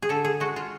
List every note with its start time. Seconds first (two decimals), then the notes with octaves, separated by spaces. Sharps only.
0.02 G#4
0.09 D3 A4
0.25 G#4
0.40 G#3 F#4
0.56 F4